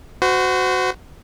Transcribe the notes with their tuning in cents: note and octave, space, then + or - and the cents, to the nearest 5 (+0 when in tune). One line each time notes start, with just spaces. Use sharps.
F#4 +0 C5 -35